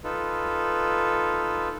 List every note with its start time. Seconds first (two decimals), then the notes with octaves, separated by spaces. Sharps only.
0.04 D#4 F4 A4 B4